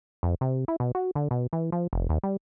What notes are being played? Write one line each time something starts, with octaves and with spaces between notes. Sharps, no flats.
F2
C3
E4
B2
F#4
D3
B2
E3
F3
F1
D#2
G3